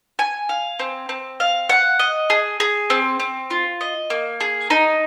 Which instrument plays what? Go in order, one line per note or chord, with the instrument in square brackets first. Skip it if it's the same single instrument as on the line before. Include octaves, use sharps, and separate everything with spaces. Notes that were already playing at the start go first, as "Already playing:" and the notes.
[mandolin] G#5
F5
C4
C4
F5
F#5
D#5
G#4
G#4
C4
C4
F4
D#5
A#3
G#4
D#4